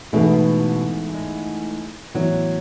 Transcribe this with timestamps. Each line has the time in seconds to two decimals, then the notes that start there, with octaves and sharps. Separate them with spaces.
0.12 G#2 B2 E3 A3 E4 G#4
1.14 G#3
2.14 A2 E3 F#3 B3 E4